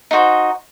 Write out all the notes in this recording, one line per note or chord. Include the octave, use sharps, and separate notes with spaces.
D#4 F#4 C5